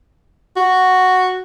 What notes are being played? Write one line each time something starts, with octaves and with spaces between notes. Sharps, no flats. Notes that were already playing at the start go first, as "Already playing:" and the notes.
F#4